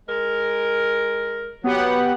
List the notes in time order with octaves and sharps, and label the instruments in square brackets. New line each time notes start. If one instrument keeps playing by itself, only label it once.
[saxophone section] G#3 A#4
[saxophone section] F#3 [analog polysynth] B3 G4 F#5